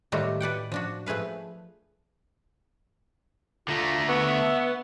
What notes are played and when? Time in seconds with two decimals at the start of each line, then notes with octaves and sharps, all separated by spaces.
0.12 A2 D#3 G3 A3 F4 F#4
0.41 B4 D5 F#5 G5
0.72 F3 D4 F#4
1.06 F3 A3 G#4 B4 F5
3.68 D3 A3 F4 A#5
4.09 B3 E5 C#6